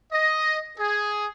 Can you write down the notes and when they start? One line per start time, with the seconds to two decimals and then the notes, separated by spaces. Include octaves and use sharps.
0.13 D#5
0.78 G#4